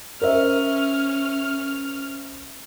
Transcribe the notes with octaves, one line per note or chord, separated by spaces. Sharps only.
C#4 A#4 C5 E5 F6